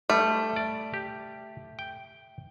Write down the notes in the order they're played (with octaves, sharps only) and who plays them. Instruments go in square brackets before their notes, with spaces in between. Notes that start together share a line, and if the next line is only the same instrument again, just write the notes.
[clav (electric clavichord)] G3 [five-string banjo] A3
[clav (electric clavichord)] D5
G4
G5